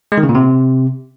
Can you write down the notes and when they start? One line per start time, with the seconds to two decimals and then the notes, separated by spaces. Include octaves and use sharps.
0.12 G#3
0.18 D#3
0.23 C#3
0.29 A#2
0.35 C3